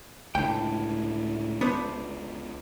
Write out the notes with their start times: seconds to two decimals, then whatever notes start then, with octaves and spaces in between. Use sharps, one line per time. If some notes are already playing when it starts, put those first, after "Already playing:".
0.35 C#2 A2 D3 G5
1.61 B3 D4 C5